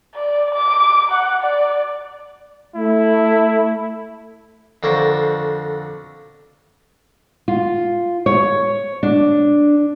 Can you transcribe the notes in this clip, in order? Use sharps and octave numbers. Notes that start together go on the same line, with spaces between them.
D5
D6
F#5
D5
A3 E4
F2 D3 A#4 C5 C#5
F4
C#5
D4